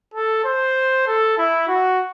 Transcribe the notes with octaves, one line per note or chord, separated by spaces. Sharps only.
A4
C5
A4
E4
F#4